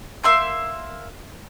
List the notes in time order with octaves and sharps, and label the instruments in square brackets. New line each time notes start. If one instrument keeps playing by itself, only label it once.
[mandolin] A#3 E5 C6 G6